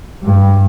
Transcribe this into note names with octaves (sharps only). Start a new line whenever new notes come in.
G2